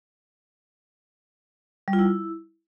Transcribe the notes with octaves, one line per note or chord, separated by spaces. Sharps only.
G3
F4
E4